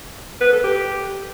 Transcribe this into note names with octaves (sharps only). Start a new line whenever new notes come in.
B4
A4
G4